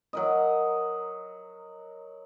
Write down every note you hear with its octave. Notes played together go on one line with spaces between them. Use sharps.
F#3 A#4 D#5